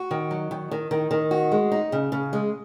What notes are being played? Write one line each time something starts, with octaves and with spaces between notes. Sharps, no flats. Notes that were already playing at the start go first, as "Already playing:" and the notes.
Already playing: F#4
D#3
F#3
D#3
D#3
D#3
D#3
F#4
G#3
D#4
C#3
C#3
G#3